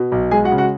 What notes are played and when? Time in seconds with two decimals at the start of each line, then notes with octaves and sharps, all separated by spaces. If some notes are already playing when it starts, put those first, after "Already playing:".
Already playing: B2
0.12 B1
0.31 G#3 G#4 G#5
0.44 F#4 F#5
0.52 C#3
0.58 F#4 F#5